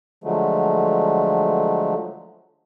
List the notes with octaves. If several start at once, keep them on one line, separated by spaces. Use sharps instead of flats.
D3 F3 F#3 G#3 A3